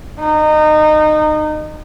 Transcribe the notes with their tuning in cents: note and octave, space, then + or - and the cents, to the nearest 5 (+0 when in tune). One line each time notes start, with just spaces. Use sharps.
D#4 -25